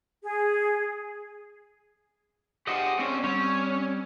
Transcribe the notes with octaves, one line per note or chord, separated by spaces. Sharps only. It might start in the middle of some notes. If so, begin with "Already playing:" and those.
G#4
G4 G#4 C5 D#5 F#5
C4 C#4
G3 C4 C#4 C#5